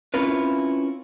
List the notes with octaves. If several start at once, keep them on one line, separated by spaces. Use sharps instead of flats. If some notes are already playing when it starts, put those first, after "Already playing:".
C4 C#4 E4 F4 A#4 B4